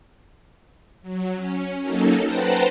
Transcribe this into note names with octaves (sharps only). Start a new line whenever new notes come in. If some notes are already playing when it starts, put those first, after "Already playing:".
F#3
C#4
F#3 A#3 C#4 D#4 A4
B4 C5 F#5 G5 A5 A#5